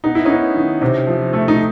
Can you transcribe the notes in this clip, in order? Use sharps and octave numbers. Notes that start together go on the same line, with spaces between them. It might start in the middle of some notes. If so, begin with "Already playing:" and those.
B3 D#4
E4
B3 C#4 D#4
D#3
C3
F3
A3
D#4